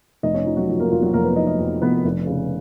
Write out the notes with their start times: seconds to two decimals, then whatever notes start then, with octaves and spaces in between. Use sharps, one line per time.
0.23 F1 D#4 D#5
0.35 C#4 C#5
0.46 F3 D#4
0.57 F#3 F#4
0.69 F2
0.80 A#3 A#4
0.92 F1 F4
1.02 F#3 F#4
1.14 F1 A#3 A#4
1.25 B3 B4
1.36 F3 D#4 D#5
1.47 D#4 D#5
1.59 F2
1.82 F1 B3 B4
2.05 F1
2.27 C#3